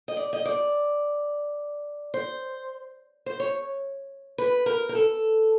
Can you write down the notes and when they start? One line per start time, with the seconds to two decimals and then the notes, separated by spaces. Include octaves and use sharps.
0.08 D#5
0.17 D5
0.33 D#5
0.45 D5
2.14 C5
3.26 C5
3.40 C#5
4.38 B4
4.66 A#4
4.89 A#4
4.95 A4